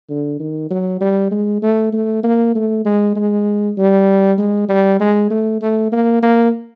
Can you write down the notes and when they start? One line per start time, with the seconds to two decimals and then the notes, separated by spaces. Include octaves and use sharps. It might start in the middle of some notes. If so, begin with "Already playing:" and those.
0.10 D3
0.40 D#3
0.70 F#3
1.01 G3
1.31 G#3
1.62 A3
1.93 A3
2.23 A#3
2.55 A3
2.85 G#3
3.16 G#3
3.78 G3
4.38 G#3
4.69 G3
5.00 G#3
5.30 A3
5.61 A3
5.92 A#3
6.22 A#3